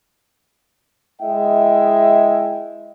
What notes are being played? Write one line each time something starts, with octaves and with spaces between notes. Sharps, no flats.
G#3 E4 D#5 E5 G5